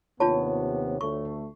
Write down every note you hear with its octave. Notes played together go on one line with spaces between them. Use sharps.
D#2 C3 B3 D4 F4 C#5 A5
D2 A3 C#6